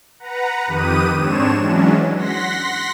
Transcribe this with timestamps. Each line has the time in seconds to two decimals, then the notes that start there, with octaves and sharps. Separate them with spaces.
0.19 B4 F#5 A#5
0.66 F2 D#3 G4 B4 D#6 D#7
1.15 G#2 C4 D4 C#5 E7
1.56 E3 F#3 G#3 C#4 D4
2.15 F#5 C6 A#6 B6